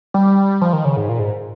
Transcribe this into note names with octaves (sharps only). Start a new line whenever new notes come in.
G3
F3
D#3
C#3
G#2
A#2
G#2